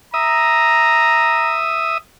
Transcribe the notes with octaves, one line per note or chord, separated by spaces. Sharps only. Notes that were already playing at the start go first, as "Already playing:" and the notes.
E5 A#5 D#6